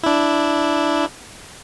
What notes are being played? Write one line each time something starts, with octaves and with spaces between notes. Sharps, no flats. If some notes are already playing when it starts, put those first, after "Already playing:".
D4 E4